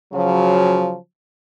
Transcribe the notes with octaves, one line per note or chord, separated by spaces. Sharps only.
C#3 F3 F#3